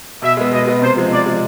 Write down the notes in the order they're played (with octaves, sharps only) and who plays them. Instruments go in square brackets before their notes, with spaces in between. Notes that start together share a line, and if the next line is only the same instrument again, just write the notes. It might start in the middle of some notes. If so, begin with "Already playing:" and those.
[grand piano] B2 [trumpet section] E5
[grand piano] G#3 B3
[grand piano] B2 [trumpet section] D#5
[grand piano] G#3 B3
[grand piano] C3 [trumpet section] C5
[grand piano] F3 G#3
[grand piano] C3 [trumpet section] D5
[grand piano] F3 G#3